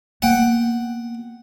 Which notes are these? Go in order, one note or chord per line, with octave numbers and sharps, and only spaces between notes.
A#3 B3 F#5 G5